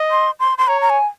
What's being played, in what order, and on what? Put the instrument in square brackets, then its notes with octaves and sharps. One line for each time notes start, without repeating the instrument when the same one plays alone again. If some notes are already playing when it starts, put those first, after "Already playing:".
Already playing: [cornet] D#5
[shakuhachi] C6
C6
C6
[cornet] C#5 [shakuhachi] A#5
[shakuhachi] A#5
G#5